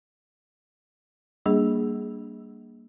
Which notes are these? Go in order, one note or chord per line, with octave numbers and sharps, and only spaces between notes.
G3 A#3 D4 G#4